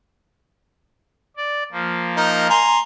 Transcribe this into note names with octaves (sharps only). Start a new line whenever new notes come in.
D5
F3 A#3
D#4 A#4
G#5 A#5 C6